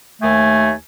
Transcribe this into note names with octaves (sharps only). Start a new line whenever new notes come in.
D#2 A3 G#5